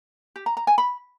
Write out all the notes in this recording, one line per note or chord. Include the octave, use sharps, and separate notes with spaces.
G4
A#5
A#5
G#5
B5